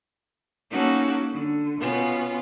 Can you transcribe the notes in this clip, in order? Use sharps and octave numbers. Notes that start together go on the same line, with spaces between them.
A#3 C#4 D#4 F#4 A4
D3
B2 B3 C#4 F4